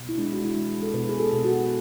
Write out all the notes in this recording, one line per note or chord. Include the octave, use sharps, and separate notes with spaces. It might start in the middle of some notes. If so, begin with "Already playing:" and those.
Already playing: B2
E4
G#3 D4
F#4
E4
G#3
A4
B2 B4
G#4
A4
B2
F#4